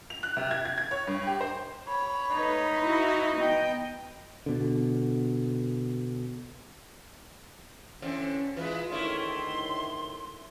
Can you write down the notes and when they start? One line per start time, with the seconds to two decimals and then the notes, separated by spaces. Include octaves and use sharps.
0.10 F7
0.23 F#6
0.37 C3
0.51 G#6
0.65 G#6
0.78 G#6
0.91 C#5
1.07 G2
1.27 G4
1.41 C5
1.87 C#5 B5
2.32 A3 D#4 B4
2.80 E4 F#4 B4
3.38 B3 D#5 G5
4.46 B2 D3
8.02 D3 E3 C4 C#4
8.57 E3 G#3 F4 B4
8.91 D2 A2 D#3 A3 C#4 E4 C6